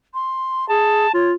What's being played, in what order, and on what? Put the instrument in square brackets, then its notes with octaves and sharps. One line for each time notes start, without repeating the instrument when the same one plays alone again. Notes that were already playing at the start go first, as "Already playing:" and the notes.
[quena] C6
[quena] G#4 [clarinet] A5
[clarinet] F4 [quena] C#5